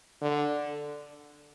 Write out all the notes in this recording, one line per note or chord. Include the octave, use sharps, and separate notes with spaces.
D3